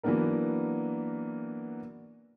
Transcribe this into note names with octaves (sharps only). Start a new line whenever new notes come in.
E3 F#3 A#3 B3 D4 A#4